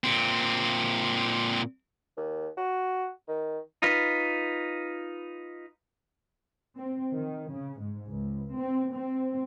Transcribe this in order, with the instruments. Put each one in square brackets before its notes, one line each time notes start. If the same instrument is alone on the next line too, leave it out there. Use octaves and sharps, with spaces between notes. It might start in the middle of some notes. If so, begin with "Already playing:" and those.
[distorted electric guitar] A#2 C4
[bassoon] D#2
F#4
D#3
[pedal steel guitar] D#4 F4 B4
[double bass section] C4
D#3
C#3
G#2
C#2
C4
C4